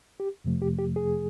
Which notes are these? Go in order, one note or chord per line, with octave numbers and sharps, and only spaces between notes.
G4
F2 C3 F3 A3
G4
G4
G#4